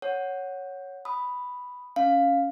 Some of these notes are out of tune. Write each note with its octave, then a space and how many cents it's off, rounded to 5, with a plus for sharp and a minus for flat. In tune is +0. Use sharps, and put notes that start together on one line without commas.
C#5 +0 F#5 +0
B5 +0 D#6 +0
C#4 +5 F5 +0